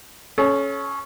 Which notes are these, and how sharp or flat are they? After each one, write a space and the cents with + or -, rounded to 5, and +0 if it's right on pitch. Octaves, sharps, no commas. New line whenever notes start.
C#4 +0 A4 -40